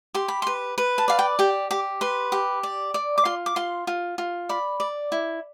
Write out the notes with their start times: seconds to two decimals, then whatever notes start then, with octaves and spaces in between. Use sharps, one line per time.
0.14 G4 C6
0.28 B5
0.42 B4 C6
0.78 B4
0.98 A5
1.08 D5 F5
1.19 G5
1.39 G4 G5
1.71 G4 D6
2.01 B4 C6
2.32 G4
2.63 D5
2.94 D5
3.18 D6
3.25 F4 C6
3.46 D6
3.56 F4 C6
3.87 F4
4.18 F4
4.49 D5 B5
4.80 D5
5.12 E4